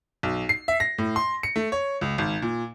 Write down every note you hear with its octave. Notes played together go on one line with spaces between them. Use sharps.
B1
C7
E5
A#6
A2
C6
C#7
A3
C#5
C#2
G#1
A#2